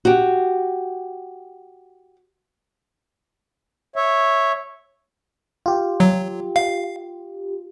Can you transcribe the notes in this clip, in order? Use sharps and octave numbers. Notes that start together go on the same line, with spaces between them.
F#4 G4
C#5 E5
F4 G4
F#3
F5